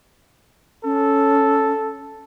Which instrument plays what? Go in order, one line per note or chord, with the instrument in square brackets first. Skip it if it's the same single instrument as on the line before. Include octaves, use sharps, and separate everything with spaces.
[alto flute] C#4 [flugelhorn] A4